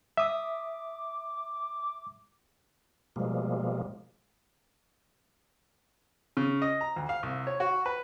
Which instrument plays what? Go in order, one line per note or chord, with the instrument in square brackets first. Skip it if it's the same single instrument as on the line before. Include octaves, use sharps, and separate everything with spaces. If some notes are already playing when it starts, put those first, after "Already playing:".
[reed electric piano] E5 D#6 [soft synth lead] D6
[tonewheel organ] B2 F3 G3 G#3 A#3
[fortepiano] C#3
D#5
A#5
D2
F5
C2
C#5
F#4
B4